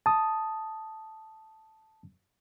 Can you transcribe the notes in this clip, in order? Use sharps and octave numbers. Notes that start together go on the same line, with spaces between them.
A5 D#6